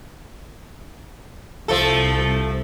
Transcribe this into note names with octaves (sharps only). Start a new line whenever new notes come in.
C2 F3 A3 A4